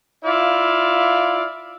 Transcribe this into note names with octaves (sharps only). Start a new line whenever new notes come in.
E4 F4 D5 E5 F5